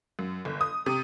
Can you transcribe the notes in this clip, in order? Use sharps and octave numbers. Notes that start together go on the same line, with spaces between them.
F#2
G1
D#6
C3